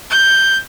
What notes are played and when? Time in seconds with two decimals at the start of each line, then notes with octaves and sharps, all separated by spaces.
0.11 G6